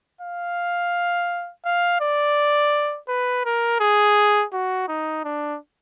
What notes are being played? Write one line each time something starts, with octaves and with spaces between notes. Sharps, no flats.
F5
F5
D5
B4
A#4
G#4
F#4
D#4
D4